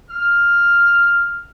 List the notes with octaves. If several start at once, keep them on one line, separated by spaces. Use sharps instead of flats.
F6